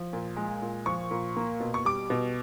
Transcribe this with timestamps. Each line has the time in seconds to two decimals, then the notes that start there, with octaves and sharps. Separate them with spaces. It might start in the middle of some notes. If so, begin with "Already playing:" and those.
Already playing: F3
0.13 A#2
0.37 G#3
0.62 A#2
0.86 F3 C#6
1.11 A#2
1.36 A#3
1.60 B2
1.74 C#6
1.85 G3 D6
2.10 B2